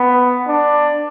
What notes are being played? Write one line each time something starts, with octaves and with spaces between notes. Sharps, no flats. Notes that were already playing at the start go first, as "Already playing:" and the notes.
Already playing: B3
D4